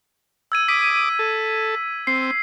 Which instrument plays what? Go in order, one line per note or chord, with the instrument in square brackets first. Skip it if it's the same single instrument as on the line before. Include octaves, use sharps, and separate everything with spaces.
[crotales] E6 G#6 D#7
[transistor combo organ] D6 D#6 [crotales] B6
[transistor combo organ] A4
[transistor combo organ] C4 [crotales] C7